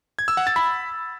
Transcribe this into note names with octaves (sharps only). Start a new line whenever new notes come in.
G#6
E6
F#5
A6
B5